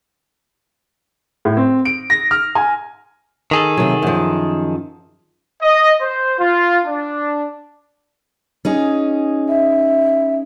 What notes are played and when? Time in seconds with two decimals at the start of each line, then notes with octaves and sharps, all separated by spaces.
1.45 A2
1.57 C4
1.85 D7
2.10 A#6
2.31 F6
2.55 G#5
3.51 D#3 G#4 A4
3.77 C3 F#3
4.02 F#2 F3
5.62 D#5
6.02 C5
6.40 F4
6.86 D4
8.65 C#4 D#4 G#4
9.48 E5